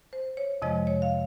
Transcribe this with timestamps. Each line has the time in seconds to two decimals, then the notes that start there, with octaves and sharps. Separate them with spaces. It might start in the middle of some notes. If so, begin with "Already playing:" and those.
0.13 C5
0.37 C#5
0.62 F2 C3 F3 G#3 D#5
0.87 C#5
1.02 F5